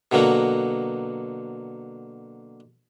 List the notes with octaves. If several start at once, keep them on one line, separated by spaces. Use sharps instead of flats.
B2 D3 F#3 A#3